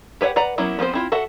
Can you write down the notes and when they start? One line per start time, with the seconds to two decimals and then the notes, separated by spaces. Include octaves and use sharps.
0.21 G4 B4 C#5 E5 F#5
0.36 B4 D5 F#5 A#5
0.58 F#3 A#3 B3 C#4 E4
0.79 F3 B3 C4 C5
0.94 C4 E4 F4
1.12 F#4 A4 E5 F#5